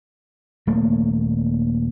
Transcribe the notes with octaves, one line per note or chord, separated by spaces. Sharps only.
D#1 A3 A#3